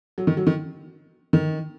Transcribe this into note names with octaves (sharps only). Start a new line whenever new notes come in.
F#3
D#3
F#3
D#3
D#3